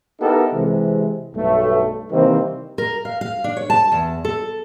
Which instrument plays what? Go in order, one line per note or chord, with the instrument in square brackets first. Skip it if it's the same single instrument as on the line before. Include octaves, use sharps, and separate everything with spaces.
[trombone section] B3 D#4 E4 G4 A4 A#4
C3 E3 G#3
B1 G2 A3
C3 D#3 E3 G3 A#3 C4
[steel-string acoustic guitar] A#4
F5
F5
D4
C#5
A5
E2
A4